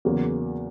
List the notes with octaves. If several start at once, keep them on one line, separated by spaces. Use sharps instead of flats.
E2 C#3 F#3 A#3